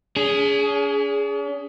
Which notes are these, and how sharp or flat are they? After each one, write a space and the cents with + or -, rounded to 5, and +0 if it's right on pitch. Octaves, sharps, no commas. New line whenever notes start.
C#4 +45 G#4 +0